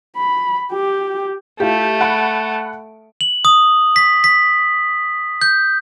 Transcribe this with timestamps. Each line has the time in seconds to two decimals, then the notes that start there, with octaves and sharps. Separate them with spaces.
0.17 B5
0.72 G4
1.60 A3 E4 F4 G4
2.01 F#5 B5 D7
3.21 F#7
3.45 D#6
3.96 B6
4.24 B6
5.41 G6